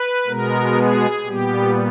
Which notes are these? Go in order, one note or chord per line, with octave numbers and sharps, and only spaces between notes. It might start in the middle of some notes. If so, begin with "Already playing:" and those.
Already playing: B4
B2 G#3 B3 A#4
G#4
A#2 G3 B3 G4